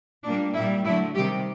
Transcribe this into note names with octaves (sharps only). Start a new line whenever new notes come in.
A#2 G3 A#3 D4
A#2 G3 A#3 E4
D3 F#3 A3 E4
C3 D#3 G3 G4